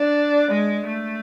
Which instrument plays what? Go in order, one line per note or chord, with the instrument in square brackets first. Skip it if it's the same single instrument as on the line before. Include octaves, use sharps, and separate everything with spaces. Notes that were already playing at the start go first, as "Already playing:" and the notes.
Already playing: [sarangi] D4
G#3
A3